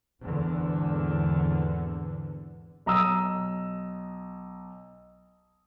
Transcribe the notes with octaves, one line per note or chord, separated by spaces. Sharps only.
G#1 E2 D3
B1 A#5 D#6 E6